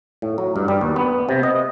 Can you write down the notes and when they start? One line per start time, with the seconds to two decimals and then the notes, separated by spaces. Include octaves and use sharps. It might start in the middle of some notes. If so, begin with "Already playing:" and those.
0.22 A2
0.38 F#3
0.56 G2
0.68 G3
0.81 D#2
0.96 B3
1.29 C3
1.43 D#5